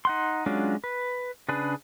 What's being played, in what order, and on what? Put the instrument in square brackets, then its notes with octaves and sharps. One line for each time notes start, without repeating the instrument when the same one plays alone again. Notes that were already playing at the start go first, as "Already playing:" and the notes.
[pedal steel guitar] D#4 F#5 C6
F#3 G#3 C#4 D4 F4
B4
C#3 D4 G#4 B4